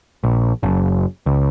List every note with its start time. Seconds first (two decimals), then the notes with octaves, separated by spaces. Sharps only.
0.24 A#1
0.63 F#1
1.26 C#2